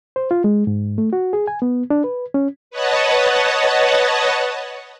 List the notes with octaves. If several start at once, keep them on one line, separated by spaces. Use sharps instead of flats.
C5
F4
G#3
G#2
A3
F#4
G#4
G#5
B3
D4
B4
C#4
B4 C#5 D#5 F#5 A5